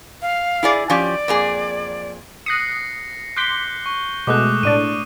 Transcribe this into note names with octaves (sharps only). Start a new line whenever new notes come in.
F5
E4 G#4 D5
F3 C#4 G4 D5
F2 A#3 G#4
D#6 F#6 A#6 C7 C#7
C6 D6 F#6 G6 B6 G7
C#6
B2 G#3 A3 D6 D#6 F#6
A2 D4 D5 D#7